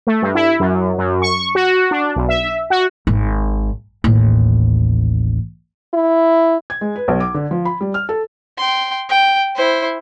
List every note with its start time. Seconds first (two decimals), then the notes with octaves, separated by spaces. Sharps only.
0.07 A3
0.22 G2
0.35 E4
0.60 F#2
0.98 F#2
1.22 C#6
1.55 F#4
1.91 D4
2.16 B1
2.29 E5
2.70 F#4
3.07 G#1
4.04 A1 D#2
5.93 E4
6.70 G#6
6.81 G#3
6.96 B4
7.08 B1
7.20 D6
7.34 D3
7.51 F3
7.65 B5
7.81 G3
7.94 F6
8.09 A4
8.57 G5 C6
9.09 G5
9.56 E4 C5